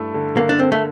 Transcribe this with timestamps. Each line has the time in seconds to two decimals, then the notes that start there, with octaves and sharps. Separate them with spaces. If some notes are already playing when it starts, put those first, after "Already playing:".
Already playing: G2 A3 E4
0.14 D3
0.37 D3 A#3
0.49 D4
0.59 A#3 C4
0.72 A3